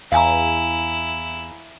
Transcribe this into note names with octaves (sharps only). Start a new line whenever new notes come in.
E2 E4 F5 G#5 A#5